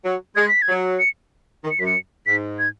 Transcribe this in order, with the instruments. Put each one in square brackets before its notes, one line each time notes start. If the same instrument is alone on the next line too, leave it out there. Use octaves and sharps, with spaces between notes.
[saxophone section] F#3
[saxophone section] G#3 [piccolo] G#6
[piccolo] B6
G#6
[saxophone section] F#3
[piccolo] C#7
[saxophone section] D#3
[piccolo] C#7
[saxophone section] F#2 [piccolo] B6
[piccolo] C#7
[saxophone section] G#2 [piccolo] B6
[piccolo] G#6